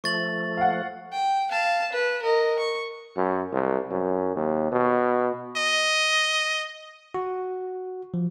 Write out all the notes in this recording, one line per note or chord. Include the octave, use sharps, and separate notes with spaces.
F3 A3 C#6 A6 F#7
F5 F#5
G5
F5 A5
B4
A#4 D#5
C#6
F#2
C2
F#2
D#2
B2
D#5
F#4
F3